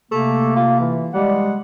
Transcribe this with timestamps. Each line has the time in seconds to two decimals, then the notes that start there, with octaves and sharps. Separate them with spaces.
0.12 C3 A3 A#3
0.56 F4
0.79 E3
1.14 G3 G#3 F#5